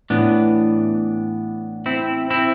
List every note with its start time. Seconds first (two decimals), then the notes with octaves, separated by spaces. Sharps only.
0.10 A2 E3 B3 D4
1.86 C4 E4
2.30 C4 E4